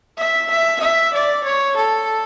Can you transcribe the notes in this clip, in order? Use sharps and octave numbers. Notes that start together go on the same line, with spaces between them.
E5
E5
E5
D5
C#5
A4